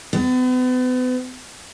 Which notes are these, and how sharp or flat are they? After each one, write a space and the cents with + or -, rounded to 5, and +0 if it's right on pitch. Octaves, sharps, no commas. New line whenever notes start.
B3 +40